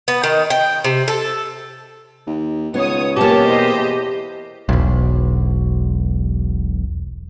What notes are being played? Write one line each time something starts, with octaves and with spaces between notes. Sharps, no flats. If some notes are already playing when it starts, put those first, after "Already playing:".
B3
D#3
G5
C3
A4
D#2
C#2 B3 C#5 D#6
B2 A#3 C#4 G4 A5
E2 C5 D#5
E1 B1